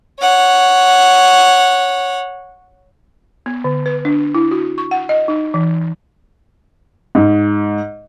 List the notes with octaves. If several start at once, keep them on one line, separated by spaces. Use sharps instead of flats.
C#5 F#5
B3
D3
B4
D4
E4
F#4
C#6
F#5
D#5
D#4
E3
G#2